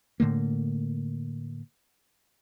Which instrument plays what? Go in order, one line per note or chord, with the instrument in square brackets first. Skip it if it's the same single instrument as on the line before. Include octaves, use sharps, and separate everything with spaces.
[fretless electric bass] A2 D3 A3 A#3